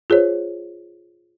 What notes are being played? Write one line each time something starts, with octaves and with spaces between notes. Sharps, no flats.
F4 G#4 C5 C#5